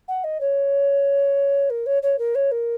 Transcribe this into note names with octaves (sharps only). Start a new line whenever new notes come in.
F#5
D#5
C#5
A#4
C#5
C#5
A#4
C#5
A#4